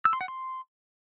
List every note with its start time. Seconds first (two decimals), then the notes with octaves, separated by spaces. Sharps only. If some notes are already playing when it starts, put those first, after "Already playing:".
0.05 E6
0.13 C6
0.21 F#5
0.28 C6